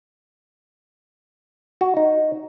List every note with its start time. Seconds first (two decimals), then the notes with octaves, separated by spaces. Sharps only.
1.81 F#4
1.97 D#4